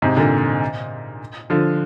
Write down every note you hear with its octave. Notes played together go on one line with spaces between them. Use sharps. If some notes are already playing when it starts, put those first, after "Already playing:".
G#2 C3
A#2 D3
D3 F3